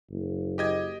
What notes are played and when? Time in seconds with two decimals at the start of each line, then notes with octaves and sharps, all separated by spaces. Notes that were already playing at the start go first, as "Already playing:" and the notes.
0.10 F#1
0.58 G4 D#5 G#6